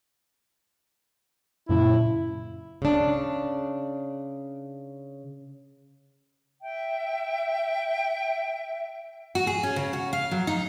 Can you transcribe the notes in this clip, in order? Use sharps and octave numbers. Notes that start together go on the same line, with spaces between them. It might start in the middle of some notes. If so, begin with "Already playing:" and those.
F#2 A#2 C#3 E4
C#3 D4
E5 G5
F#4
G#4
C#4
C#3
F#4
F5
F#3
D#4